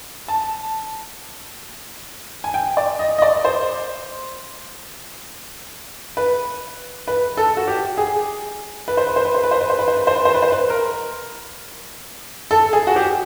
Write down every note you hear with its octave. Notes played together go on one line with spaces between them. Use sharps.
A5
G#5
G5
D5
D#5
D#5
D5
C5
B4
B4
A4
F#4
G4
G#4
B4
C5
B4
C5
B4
C5
B4
C5
B4
C5
B4
C5
B4
C5
B4
C5
B4
C5
B4
A#4
A4
G#4
F#4
G4